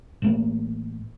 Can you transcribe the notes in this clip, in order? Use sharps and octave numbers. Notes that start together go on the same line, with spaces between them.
A1 A3 A#3